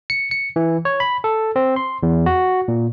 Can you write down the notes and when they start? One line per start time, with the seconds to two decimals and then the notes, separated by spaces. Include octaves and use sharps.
0.10 C#7
0.31 C#7
0.56 E3
0.85 C#5
1.00 B5
1.24 A4
1.56 C4
1.76 C6
2.03 E2
2.26 F#4
2.68 A#2